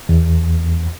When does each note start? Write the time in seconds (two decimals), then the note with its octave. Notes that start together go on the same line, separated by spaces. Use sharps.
0.09 E2